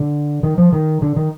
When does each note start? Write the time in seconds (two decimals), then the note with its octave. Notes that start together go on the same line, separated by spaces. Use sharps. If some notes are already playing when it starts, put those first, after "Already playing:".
Already playing: D3
0.43 D#3
0.58 F3
0.73 D#3
1.02 D3
1.16 D#3